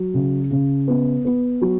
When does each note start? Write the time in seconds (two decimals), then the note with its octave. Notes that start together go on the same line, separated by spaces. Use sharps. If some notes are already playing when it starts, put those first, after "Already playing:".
Already playing: F#3
0.14 C#3
0.51 C#3
0.88 B3
1.25 B3
1.61 F#3